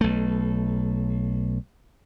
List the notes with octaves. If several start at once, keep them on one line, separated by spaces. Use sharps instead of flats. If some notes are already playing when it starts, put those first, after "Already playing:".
B1 A3